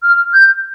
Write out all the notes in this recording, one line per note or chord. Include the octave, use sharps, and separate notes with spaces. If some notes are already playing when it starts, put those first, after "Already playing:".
F6
G6